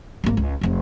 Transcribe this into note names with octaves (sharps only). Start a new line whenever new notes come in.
G#1 A#3
C#2
F1 F2